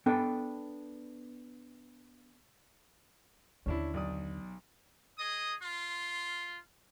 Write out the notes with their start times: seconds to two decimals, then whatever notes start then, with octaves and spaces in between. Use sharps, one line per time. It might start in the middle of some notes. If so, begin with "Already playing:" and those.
0.06 B3 D4 A4 G5
3.66 D#2 D3 C#4 D4 E4
3.94 B1 D5 D#6
5.18 G#4 D#5 D#6
5.63 F4 C6